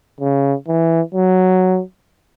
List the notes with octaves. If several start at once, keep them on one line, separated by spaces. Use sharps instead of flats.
C#3
E3
F#3